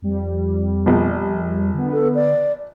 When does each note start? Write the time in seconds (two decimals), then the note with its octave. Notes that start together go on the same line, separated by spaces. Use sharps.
0.02 F2 G3
0.86 A#1 B2
1.74 D3 B3
1.92 A4
2.15 D5